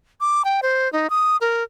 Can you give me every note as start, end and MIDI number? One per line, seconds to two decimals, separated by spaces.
0.21 0.43 86
0.45 0.61 79
0.63 0.91 72
0.93 1.10 63
1.10 1.37 87
1.41 1.63 70